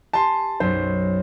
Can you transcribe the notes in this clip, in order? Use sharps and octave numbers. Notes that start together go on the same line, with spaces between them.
G4 G#5 A5 C6
B1 F#2 C5